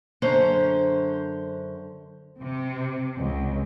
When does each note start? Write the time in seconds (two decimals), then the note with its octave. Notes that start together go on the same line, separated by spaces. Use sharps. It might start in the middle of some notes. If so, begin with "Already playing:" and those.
0.22 F#2 D3 C#4 C5
2.40 C3
3.17 C#2